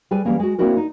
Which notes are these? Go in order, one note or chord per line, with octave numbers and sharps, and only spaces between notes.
G3 G#4 B4 G#5
E3 G3 G#3 A#3 C#4
G#3 F#4
A#3 C4 D4 E4 F#4 A#4
D#4